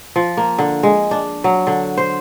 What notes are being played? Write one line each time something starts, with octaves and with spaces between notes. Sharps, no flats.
F3
A#3
D3
G#3
D4
F#3
D3
C5